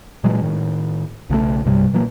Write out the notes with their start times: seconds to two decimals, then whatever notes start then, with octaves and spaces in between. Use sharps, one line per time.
0.24 A#2 E3 F#3 G#3
0.42 A2 D#3
1.30 B1 C#3 E3 A3
1.65 B1 G2 C3 G3
1.93 A#2 E3 F#3 A#3